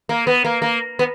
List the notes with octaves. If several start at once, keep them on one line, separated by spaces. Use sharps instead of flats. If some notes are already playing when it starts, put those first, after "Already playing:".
A#3
B3
A#3
A#3
B3